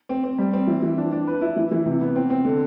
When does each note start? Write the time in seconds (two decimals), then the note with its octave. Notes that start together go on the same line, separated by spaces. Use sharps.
0.09 C4
0.24 C4
0.38 G3
0.53 C4
0.67 E3
0.83 E3
0.98 D4
1.12 D4
1.27 B4
1.41 E4
1.56 E3
1.71 E3
1.86 C3
2.01 B3
2.16 C4
2.30 C4
2.45 D3